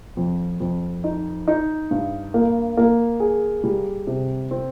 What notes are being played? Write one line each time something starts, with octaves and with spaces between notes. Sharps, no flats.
F2
F2
D#4
D#4
G2
A#3
A#3
G#4
G3
C3
C4